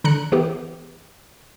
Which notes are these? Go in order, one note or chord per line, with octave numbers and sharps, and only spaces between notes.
D3 A#5 F#6 C#7
E3 B3 G4